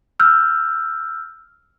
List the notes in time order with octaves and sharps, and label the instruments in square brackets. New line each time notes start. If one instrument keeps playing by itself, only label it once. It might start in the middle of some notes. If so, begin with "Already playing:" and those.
[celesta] E6 F6 G6